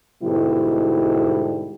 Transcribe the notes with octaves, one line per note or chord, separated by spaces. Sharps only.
G#2 B2 D3 G3 E4